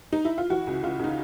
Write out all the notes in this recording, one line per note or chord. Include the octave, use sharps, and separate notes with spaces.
D#4
E4
F4
E3 F#4
C#2
C#2 F4
C#3 D#4